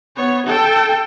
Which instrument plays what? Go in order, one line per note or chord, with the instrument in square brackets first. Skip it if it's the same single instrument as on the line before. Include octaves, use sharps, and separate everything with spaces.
[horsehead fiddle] B3 C#5
A4 G5